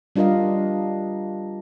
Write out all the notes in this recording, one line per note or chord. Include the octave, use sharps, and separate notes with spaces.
G3 D4 F4 A#4 D#5 F5